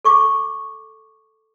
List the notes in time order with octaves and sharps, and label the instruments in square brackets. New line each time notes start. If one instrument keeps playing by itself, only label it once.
[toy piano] A4 C#6 D6